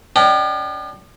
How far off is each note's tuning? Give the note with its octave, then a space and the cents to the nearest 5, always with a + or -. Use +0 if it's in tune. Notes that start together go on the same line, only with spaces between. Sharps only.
C#4 +40 D5 +45 G5 -25